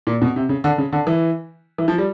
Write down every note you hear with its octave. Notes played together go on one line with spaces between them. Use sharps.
A#2
B2
C3
C#3
D3
C#3
D3
E3
E3
F3
G3